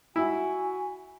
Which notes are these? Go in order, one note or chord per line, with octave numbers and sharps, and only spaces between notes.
E4 F#4 G#5